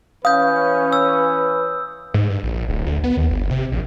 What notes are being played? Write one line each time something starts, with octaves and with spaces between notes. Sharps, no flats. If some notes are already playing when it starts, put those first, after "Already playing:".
E3 C#4 B4 F5 D#6 G6
E6
G#2
G2
A#1
D1
D2
B3
D#2
G1
C3
A#1